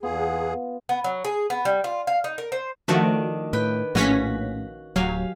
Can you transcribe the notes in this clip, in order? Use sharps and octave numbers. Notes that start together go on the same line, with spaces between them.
E2 B3 F4 G#4 F5
B3
F#3
G#4
B3
G3
F4
F5
D#4
A#4
C5
D#3 F3 A3 D4 F#4
A2 B4 G5
A#1 A2 C#4 F#4 F5 B6
D1 F#3 G4 F5 G#5